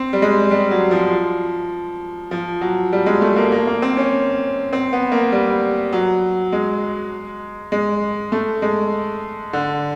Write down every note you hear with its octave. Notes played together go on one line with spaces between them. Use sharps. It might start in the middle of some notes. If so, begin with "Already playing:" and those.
Already playing: C4
G3
G#3
G3
F#3
F3
F3
F#3
G3
G#3
A3
A#3
A#3
A#3
C4
C#4
C4
B3
A#3
G3
F#3
G#3
G#3
A3
G#3
D3